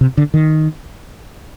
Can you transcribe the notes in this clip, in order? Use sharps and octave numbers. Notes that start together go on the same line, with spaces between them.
C3
D3
D#3